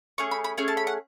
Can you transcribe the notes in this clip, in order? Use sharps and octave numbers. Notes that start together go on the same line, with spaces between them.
A3 C#4 G#4 C#6
B5
B5
A3 C#4 G#4 G#5
A5
B5
F#5